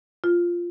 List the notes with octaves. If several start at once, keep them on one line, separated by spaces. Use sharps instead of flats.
F4